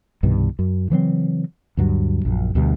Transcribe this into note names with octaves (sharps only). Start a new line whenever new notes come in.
C2 G2 B2 D#3
F#2
C#3 E3 F#3 C4
D2 G2 F#3
A#1 F#2
D2 B2 G3